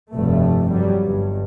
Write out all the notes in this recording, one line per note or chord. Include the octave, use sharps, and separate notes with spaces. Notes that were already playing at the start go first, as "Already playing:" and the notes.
F1 G2 B2 A3
G2 F#3 G3
G1 G2